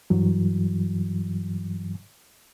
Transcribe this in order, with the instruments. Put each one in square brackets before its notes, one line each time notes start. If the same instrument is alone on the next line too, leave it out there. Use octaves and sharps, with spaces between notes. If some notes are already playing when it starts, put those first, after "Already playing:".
[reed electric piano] G2 E3 F#3